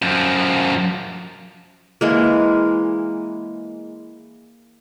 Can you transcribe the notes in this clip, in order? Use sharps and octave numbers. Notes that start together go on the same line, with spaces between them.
F#2 F3
E3 G#3 A#3